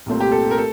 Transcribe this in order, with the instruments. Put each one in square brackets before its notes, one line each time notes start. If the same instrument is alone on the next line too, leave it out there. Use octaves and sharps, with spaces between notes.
[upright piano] C2 A#2 A3 C4
G4
A4
A#4
A3 A4